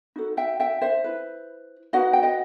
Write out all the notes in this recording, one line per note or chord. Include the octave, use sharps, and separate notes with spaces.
D#4 F#4 A4
E5 G5
E5 G5
C5 E5
E4 B4
D#4 F#4 B4 D#5 F#5
G5
D#5 F#5